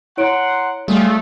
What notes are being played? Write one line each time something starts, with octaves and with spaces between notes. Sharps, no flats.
E4 C#5 F#5 A#5 C6 D7
G3 A3 F4 G#4